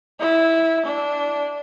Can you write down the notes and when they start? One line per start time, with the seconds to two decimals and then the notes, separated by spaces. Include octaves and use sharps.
0.20 E4
0.85 D4